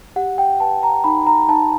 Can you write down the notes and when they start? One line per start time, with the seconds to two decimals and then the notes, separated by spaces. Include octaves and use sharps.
0.16 G4 F#5
0.38 G5
0.60 B4 A5
0.83 A#5
1.04 D#4 B5
1.27 A#5
1.48 D#4 A5